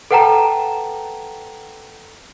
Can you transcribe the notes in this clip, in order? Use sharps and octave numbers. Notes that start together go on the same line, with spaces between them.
A4 B4 F#5 G5 A5 A#5